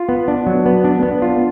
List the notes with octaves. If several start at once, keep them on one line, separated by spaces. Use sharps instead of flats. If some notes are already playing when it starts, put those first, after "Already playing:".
Already playing: F4
B3
D4
F#3
B3
D4
B3
F4